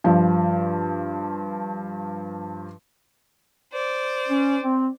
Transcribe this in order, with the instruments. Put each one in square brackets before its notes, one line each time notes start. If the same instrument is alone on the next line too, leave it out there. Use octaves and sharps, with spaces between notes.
[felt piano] G2 F3
[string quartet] C5 D5
[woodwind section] C#4
C4